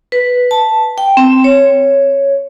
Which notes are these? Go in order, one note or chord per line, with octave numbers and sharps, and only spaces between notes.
B4
A5
G5
C4
C#5